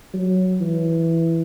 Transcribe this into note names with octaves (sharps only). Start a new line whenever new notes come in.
F#3
E3